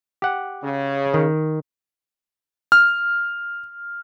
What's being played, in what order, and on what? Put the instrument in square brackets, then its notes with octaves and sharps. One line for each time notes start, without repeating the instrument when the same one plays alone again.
[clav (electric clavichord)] G4 F#5
[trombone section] C#3
[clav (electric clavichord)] D#3
[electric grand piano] F6